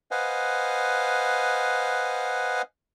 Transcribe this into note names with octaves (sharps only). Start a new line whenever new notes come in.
B4 C5 D#5 F5 F#5 G#5